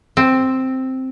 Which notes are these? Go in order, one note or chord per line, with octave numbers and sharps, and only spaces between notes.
C4